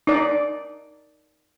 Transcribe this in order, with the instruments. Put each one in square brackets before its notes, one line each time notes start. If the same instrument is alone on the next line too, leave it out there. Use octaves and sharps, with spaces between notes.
[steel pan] D#4 D5